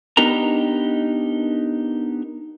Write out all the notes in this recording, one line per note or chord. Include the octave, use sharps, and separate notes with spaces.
B3 D4 D#4 G4 A#4 A#5